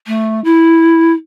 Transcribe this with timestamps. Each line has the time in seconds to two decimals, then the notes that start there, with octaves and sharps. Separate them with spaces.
0.07 A3
0.44 E4